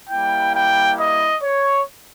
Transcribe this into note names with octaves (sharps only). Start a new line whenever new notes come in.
G3 A#3 E4 G5
G5
D#5
C#5